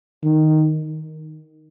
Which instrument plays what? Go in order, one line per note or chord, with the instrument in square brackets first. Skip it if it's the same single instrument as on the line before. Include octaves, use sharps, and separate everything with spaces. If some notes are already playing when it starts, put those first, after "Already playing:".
[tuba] D#3